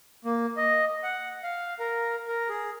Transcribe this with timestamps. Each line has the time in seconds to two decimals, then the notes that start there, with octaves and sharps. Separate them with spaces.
0.25 A#3
0.57 D#5
1.03 F#5
1.43 F5
1.80 A#4
2.28 A#4
2.49 G#4